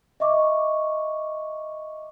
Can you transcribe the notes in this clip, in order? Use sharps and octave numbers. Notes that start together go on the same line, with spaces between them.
D#5 E5 C#6 D6